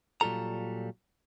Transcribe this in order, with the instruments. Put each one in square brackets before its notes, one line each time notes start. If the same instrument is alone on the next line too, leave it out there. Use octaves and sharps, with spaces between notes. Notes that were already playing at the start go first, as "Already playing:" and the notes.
[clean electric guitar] A#2 F#3 G3 F4 A4 A#5